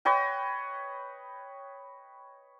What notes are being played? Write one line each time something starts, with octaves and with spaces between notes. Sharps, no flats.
B4 C#5 D#5 G5